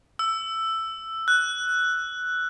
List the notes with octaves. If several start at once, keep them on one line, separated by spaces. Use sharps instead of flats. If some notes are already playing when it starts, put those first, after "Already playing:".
E6
F#6